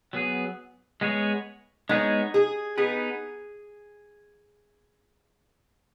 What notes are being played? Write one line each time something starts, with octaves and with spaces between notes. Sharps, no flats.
F#3 B3 G#4
G#3 B3 G#4 C#5
G#3 B3 D#4 G#4 C#5
G#4
B3 D#4 G#4 B4